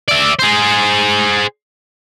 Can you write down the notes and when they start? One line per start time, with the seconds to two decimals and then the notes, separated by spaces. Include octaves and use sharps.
0.08 D5 E5
0.39 G#4 C5